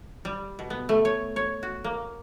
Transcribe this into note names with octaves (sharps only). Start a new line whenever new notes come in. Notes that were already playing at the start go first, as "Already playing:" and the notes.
G3
B2
B3
A3
C#5
C#5
F#4
A#3